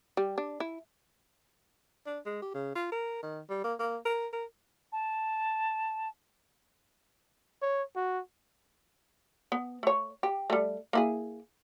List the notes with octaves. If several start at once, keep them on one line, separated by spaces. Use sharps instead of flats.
G3
D4
E4
D4
G#3
G4
C#3
F4
A#4
D#3
G3
A#3
A#3
A#4
A#4
A5
C#5
F#4
B3
A3 C#5
G4
G3 A3
A#3 E4 G#4